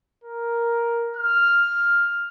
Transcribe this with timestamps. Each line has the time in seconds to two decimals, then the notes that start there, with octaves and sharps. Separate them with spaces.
0.24 A#4
1.16 F6